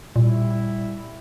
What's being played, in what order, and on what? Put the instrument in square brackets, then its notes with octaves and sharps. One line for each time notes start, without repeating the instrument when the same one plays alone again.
[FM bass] A#2 [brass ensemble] G3 E4